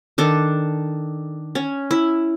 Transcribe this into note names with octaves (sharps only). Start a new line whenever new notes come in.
D#3 D4 A4
C#4
E4